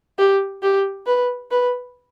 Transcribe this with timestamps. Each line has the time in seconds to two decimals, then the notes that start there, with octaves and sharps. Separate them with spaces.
0.18 G4
0.63 G4
1.07 B4
1.51 B4